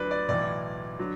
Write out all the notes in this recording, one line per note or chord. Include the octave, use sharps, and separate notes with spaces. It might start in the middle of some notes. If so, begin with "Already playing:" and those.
Already playing: D2 D3 F#3 B4 D5
D5
B1 A2 E3 D5
D3 F#3